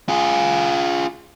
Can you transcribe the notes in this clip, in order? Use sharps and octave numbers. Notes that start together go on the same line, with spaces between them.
F4 G#4